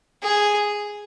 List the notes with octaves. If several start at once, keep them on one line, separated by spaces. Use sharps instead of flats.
G#4